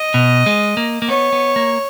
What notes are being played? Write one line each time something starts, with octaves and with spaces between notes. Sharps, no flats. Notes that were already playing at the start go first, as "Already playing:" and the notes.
Already playing: D#5
B2
G#3
A#3
A#3
B3 C#5
B3
A#3